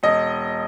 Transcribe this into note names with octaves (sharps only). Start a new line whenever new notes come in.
E1 D#5